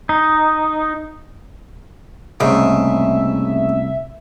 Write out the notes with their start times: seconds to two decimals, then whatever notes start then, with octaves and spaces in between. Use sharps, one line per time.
0.09 D#4
2.40 C2 G#2 C#3 A3 A#3 C#4 E5